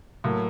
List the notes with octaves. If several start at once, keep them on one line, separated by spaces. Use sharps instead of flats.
A2 F#3 A#3